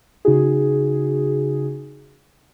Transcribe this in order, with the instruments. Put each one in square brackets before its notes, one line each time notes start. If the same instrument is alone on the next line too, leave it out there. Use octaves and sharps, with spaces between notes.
[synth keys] C#3 D#4 F#4 G#4